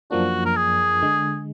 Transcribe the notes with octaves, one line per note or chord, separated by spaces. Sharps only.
F#2 F3 A#3 D4 F#4
A#4
G#4
D3 G#3